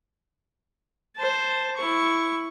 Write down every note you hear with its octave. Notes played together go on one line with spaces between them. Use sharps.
C5 A5
E4 C#6